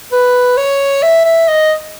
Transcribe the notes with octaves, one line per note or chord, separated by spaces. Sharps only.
B4
C#5
E5
E5
D#5